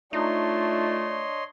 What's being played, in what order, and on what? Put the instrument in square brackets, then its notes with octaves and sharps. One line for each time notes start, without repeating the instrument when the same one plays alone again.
[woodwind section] A3 F4 [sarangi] D4 [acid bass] D#4 [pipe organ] C#5 D#5 C6